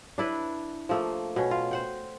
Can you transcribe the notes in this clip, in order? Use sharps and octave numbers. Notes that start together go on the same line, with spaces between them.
D4 E4 B4
F3 A3 A#3
B2 C#4
F4
C5 F#5 G5